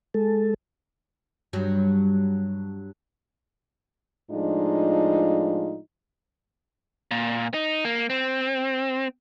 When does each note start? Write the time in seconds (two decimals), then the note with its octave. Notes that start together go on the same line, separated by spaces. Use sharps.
0.14 G#3 A4
1.53 G2 F#3
4.30 A2 F3 G#3 D4 D#4 F4
7.11 A#2
7.54 D#4
7.85 A#3
8.10 C4